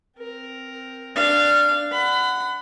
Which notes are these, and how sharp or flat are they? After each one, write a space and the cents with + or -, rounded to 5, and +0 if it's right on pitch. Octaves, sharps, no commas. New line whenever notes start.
C4 +0 A#4 +0
D4 +0 F5 -20
F#5 +0 B5 +35